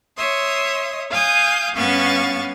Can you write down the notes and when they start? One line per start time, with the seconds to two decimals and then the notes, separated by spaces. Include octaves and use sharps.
0.17 C#5 E5 C6 D#6
1.11 F5 G#5 D#6 G6
1.75 G2 B3 C#4 F5 C#6 A6